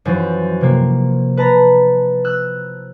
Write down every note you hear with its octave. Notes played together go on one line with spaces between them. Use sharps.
F#2 E3 F3
C3 A#3
B4 A5 A#5
E6 F#6